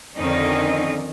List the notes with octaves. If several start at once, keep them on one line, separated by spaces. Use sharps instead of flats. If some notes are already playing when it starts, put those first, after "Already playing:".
F2 D3 D#3 C4 C#4 D#4